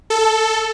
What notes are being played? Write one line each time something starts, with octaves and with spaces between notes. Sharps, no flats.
A4